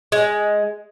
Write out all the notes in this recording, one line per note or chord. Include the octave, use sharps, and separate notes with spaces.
G#3